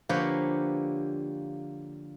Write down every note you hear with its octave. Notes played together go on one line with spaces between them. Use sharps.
D3 F3 A#3 G4 B4 C#5